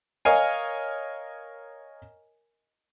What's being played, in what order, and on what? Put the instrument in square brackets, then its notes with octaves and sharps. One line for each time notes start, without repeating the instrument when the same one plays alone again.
[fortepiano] A#4 C#5 D#5 F5 G#5